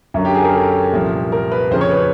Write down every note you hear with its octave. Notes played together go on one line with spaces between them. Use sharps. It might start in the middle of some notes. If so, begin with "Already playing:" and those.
F#2 D3 F#3
G4
G#4
A#4
A4
C2 A#2 F3
A#4
B4
F2 C#3 F3 C5
C#5
B4